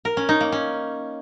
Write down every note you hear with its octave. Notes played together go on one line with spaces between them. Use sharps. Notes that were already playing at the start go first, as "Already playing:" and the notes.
A#4
C#4
D#4
A#3
C#4